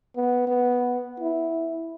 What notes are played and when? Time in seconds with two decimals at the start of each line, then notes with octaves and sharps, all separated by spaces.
0.16 B3
0.47 B3
1.20 E4